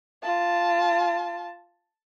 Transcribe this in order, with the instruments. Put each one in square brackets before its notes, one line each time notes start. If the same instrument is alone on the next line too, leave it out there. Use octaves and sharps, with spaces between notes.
[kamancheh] F4 A5